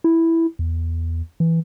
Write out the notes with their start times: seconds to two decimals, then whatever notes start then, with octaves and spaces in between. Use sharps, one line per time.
0.04 E4
0.59 E2
1.40 E3